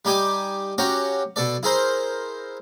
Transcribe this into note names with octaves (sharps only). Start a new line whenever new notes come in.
G3 D#4 G4 G#5 D6
C#4 F#4 G4 C#5 A#5
B2 A4 D5
E4 G#4 A#4 C5